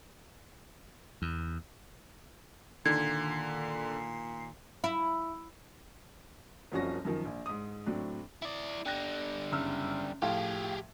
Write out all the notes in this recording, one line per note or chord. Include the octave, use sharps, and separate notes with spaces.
E2
A#2 D3 D#3 G#6 C7
E4
F#1 C2 F3 C#4 F#4 A#6
F#2 D#3 F3
A#1
G#2 D#6
A2 F#3 C4 D4
E4 D5
D3 G3 G5 F#6 A#6
F#1 E6 F6
A2 F3 F4 G4 G#4